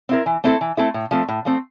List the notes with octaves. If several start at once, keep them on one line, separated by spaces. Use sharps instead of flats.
C4 E4 A#4
E3
A3 C4 E4 A4
E3
A3 C4 E4 A4
A2
F3 A3 C4
A2
F3 A3 C4